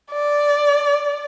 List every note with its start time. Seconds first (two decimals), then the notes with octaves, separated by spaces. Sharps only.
0.11 D5